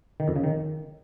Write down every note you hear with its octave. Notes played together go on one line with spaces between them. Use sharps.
D#3
F2
C#3
D#3